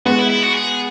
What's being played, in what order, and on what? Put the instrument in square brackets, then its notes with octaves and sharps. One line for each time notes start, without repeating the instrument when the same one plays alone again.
[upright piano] G#3 B3 [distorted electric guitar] F#4
[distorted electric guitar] E4
E4
F#4
G#4